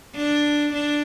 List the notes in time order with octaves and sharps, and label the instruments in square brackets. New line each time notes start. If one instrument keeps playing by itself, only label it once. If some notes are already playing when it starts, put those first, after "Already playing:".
[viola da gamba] D4
D4